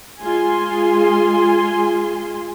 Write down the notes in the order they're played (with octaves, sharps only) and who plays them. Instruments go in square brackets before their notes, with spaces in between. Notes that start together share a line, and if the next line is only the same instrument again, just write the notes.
[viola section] G#3 F4 G#5 C6